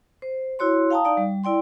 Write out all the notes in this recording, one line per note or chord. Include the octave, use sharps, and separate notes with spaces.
C5
E4 F#4 C#5 C6
F5 G5 A5 A#5 D#6
D#4 D5 F5
G3
E4 D5 G5 C6